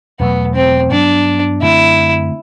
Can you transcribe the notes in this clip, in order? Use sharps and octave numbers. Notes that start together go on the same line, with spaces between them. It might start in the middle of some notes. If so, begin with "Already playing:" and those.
E2 B2 F#3 A3 B3
C4
G2 F#3 B3 D4
F#2 D3 A3 C4 E4